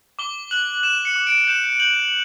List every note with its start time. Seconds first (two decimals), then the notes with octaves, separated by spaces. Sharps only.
0.19 D6 G7
0.51 F#6 F#7
0.83 F#6 E7
1.05 C#7
1.16 D6
1.27 D7
1.48 G6 E7
1.80 G6 F#7